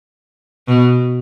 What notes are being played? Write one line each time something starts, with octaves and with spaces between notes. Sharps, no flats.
B2